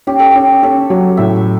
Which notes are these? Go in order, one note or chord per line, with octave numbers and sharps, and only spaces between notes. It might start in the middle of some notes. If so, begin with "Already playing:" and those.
C#4 G4
A4
C#4 G4
C#4 A4
F#3
A2 E5